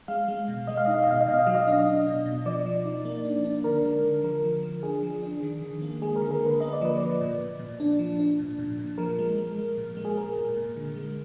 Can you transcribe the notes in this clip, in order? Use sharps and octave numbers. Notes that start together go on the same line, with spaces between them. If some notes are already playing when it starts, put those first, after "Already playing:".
G#3 F5
G#3
B2
G#3 D#5
F5
D#4 D#5
F5
D#5
B2 F5
D#5
B2 F5
D#5
F#3 F5
D#5
F5
D4
D#5
D4
B2
B2
F3 D5
F3
D#4
A#3
D4
D4
D3 A#4
G#3
D3
F3 A#4
F3
F3
D4 G#4
F3
D4
D#3
D#3
A#3
G#3 G#4
A#4
D3
A#4
D3
B4
A#3 D#5
D5
F3 B4
F3 D5
A#2
A#2
A#2
D4
F3
D4
A#2
A#2
A#2
F3 A#4
G#3
G#3
G#3
A#2
G#3
G#4
G#3 A#4
A#2
A#2
D3
G#3